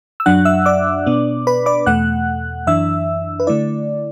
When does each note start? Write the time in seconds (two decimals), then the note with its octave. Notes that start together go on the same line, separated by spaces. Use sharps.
0.20 E6
0.26 F#2 F#3 D4 F#5 F#6
0.45 E5 E6
0.66 D5 D6
1.06 B2 B3 D4
1.47 B4 B5
1.66 D5 D6
1.86 E2 B2 A3 F#5 F#6
2.67 F#2 E3 D4 E5 E6
3.40 B4
3.47 D3 A3 E4 D5